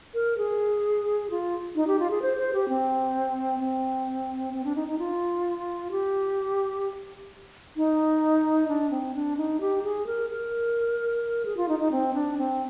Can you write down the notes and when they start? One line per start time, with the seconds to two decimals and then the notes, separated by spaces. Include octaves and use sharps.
0.14 A#4
0.38 G#4
1.30 F4
1.76 D#4
1.87 G4
1.99 F4
2.11 G#4
2.22 C5
2.37 C5
2.53 G4
2.69 C4
3.60 C4
4.54 C4
4.65 D4
4.76 D#4
4.88 D#4
4.99 F4
5.91 G4
7.77 D#4
8.68 D4
8.91 C4
9.15 D4
9.37 D#4
9.61 G4
9.83 G#4
10.07 A#4
10.30 A#4
11.45 G#4
11.57 F4
11.69 D#4
11.79 D#4
11.92 C4
12.14 D4
12.38 C4